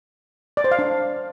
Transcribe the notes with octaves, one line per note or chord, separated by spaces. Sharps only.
D5
C5
F5
D4